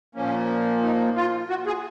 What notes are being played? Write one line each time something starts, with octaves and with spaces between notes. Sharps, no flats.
A#2 F3 A#3 C#4
D#4
F4
F#4
G#4